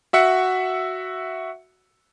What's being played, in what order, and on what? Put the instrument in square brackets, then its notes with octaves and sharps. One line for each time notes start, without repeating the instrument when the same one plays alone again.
[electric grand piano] F#4 E5 F#5 C#7